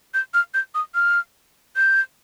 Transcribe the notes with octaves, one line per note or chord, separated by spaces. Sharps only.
G6
F6
G6
D#6
F6
G6